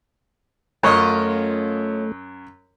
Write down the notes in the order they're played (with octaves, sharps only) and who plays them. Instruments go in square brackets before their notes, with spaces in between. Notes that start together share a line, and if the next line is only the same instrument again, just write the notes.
[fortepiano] F#2 C#5 [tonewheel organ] A3 [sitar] C#4 F4 D#5